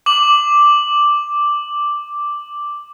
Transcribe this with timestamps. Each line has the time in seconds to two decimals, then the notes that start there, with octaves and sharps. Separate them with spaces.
0.06 D6 F#7